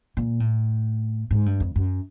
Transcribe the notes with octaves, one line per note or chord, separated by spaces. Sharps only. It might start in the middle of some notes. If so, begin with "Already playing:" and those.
A#2
A2
G#2
G2
F2
F#2